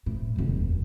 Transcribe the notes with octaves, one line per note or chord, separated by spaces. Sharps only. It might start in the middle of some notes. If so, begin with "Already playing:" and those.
A2
F1 D#2